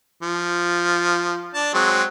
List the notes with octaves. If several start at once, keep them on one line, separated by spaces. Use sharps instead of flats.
F3
D4 A5
F#3 G#3 C4